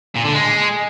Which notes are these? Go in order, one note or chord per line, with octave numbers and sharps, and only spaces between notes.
A#2
D3
G#3